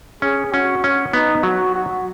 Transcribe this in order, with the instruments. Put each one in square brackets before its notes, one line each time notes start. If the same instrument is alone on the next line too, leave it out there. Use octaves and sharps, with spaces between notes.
[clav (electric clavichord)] C#4 [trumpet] G#4
[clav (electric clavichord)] C#4 [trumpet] F#4
[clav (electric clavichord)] C#4
[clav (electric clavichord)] B3 [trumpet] D#4
[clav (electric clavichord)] F#3 [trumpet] F#4
[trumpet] F#4